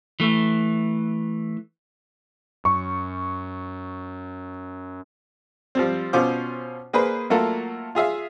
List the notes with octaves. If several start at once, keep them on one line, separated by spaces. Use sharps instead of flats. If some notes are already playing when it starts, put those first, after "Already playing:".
E3 A3
F#2 C#6
F3 G3 C4
B2 C#4 F4 C5 D6
A#3 G#4 B4 C5 B5
F#3 A3 A#3 F4 A4
F4 G#4 E5 F5